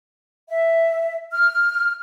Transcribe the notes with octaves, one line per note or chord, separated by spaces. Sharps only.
E5
F6